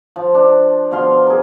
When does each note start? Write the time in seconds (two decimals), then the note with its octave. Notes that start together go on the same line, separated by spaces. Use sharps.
0.16 F3
0.35 D4
0.91 B2 F3 F5 C6
1.27 G#4 A#4